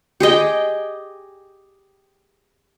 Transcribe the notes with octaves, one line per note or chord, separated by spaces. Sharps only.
G4 G#4 D#5 G5